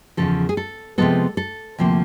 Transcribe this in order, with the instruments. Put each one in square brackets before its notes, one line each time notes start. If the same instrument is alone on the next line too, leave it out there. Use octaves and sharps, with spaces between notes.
[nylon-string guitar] E2 C#3 F3 A4
G#4
A4
C3 F3 G#3 B3 A4
A4
D2 C3 F3 A#3